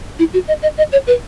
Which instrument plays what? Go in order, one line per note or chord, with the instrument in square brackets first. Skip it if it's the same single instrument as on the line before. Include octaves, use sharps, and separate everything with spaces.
[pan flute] E4
F#4
D#5
D#5
D#5
C#5
B4